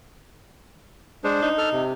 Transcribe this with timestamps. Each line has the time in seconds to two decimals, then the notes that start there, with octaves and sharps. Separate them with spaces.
1.24 G#3 D4 C5
1.42 D#4
1.58 A4 F6
1.72 C3